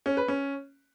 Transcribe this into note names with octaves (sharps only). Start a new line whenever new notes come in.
C#4
B4
C#4